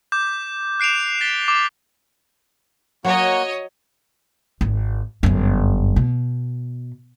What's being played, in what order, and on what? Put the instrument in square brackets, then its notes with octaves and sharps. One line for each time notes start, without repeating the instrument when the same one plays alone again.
[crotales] D6 G6
F#6 C7 D7 E7 F7
A6 B6 G7
D6
[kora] F#3 [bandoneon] A#3 F#4 [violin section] C#5 D#5
[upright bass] G#1
G1 F#2
B2